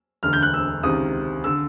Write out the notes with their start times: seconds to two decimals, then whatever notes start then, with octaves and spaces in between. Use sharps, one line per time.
0.23 E1 D2 D3 F6
0.33 G6
0.43 F#6
0.54 E6
0.83 C#2 C3 D#3 D#6
1.44 D3 E6